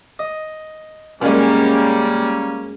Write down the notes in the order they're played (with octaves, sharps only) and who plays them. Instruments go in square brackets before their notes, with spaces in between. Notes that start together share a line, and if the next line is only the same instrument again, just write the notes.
[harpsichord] D#5
[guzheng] F#2 G#3 [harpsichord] A#2 [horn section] G3 A#3 C#4